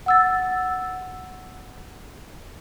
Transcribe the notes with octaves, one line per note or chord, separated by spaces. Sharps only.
F#5 E6 A6